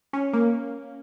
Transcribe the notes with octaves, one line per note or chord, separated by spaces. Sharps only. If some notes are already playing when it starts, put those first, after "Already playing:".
C#4
A#3